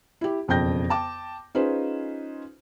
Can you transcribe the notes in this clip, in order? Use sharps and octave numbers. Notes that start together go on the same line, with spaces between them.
E4 G4
E1 F2 C#3 G5 G6 A#6
G5 A5 D6
C#4 D#4 F4 G#4 B4 C5